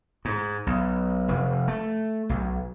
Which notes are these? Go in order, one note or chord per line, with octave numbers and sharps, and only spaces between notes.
G#2
B1
F1
A3
B1